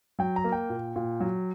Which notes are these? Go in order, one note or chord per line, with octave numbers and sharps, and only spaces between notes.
F#3 G5
A#5
A#3
G5
A#2
A#2
F#3